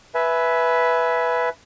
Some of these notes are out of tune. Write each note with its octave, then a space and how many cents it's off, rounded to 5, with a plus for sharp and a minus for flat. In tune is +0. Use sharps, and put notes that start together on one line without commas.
B4 +0 E5 +0 G#5 +20